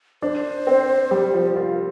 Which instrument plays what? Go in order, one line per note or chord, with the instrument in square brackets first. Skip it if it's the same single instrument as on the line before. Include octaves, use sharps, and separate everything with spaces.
[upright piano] D4 [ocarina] C5
[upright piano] C4
G3
F3
F4